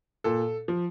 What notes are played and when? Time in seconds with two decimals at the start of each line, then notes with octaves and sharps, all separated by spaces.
0.24 A#2 A4
0.68 F3